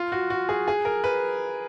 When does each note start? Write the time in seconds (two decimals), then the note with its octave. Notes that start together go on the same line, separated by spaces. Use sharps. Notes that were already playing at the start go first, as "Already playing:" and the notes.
Already playing: F4
0.12 F#4
0.30 F#4
0.49 G#4
0.68 G#4
0.85 A#4
1.04 B4